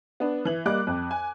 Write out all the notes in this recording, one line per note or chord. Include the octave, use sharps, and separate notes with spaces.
B3 D4
E3 F#7
G3 A#3 D#5 D6 F#6
F2
G#5